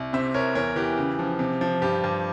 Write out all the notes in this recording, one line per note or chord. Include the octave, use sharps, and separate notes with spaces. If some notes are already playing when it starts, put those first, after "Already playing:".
Already playing: C2
C3 C5 E5
C2 A#4 C#5
E2 A#4 C#5
E3 G4
C#3
F3
C3
F3
G2 G4
G2